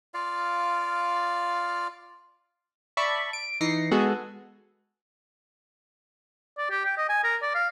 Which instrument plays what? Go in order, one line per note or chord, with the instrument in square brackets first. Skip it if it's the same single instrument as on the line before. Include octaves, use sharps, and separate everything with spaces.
[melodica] F4 D5 F5
[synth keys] D5 E5 A5 B5 C#6
D7
E3 D#4 A#6 C7 C#7
G#3 B3 F#4 G#4 A4
[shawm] D5
G4
G5
D#5
G#5
A#4
D5
F5